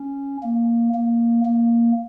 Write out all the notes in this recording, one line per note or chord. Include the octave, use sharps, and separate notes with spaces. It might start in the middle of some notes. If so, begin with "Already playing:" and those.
Already playing: C#4
A#3
A#3
A#3